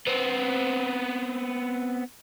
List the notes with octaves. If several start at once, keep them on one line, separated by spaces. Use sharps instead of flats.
B3 C4